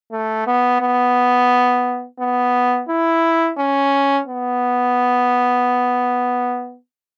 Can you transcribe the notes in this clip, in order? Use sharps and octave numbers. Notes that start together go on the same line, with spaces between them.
A3
B3
B3
B3
E4
C#4
B3